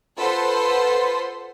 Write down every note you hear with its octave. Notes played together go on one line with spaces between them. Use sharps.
F4 A4 B4 C5 F#5 C6